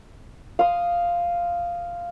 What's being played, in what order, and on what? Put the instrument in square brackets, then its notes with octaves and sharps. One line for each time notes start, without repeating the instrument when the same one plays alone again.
[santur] F5 C6 D#6